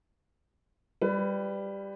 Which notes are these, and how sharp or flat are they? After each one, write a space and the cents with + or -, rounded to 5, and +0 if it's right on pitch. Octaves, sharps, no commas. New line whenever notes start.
G3 +10 G4 +5 B4 +25